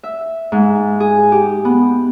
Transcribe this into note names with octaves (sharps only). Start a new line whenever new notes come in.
E5
G#2
G#4
G4
B3